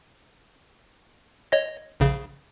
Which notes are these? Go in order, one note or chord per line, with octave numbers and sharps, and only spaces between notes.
C#5 D#5 A#6
A#1 C#3